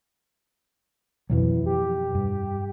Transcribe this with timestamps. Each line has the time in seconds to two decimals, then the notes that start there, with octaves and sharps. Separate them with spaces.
1.30 F2 B2 E3 F#3
1.66 G4
2.15 G2